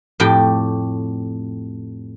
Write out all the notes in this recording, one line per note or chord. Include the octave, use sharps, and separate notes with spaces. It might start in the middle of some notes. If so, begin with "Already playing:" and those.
F2 A2 G4 G5